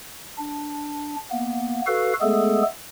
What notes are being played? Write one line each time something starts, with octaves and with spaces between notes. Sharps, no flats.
D4
A#3 B3
F#4 A4 B4 F5
G#3 A3 B3 G#4 A4